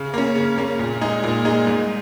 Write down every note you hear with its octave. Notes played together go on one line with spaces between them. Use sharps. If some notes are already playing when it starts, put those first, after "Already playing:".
Already playing: C#3
A#3 C#4
C#3
A#3 C#4
A#2
G#3 D#4 G#4
A#2
G#3 D#4 G#4
G#2